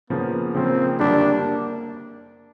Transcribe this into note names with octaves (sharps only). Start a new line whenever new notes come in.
C#3 F3 A#3 B3
C#3 F3 A#3 C4
F#2 D3 G3 A#3 D4
A#3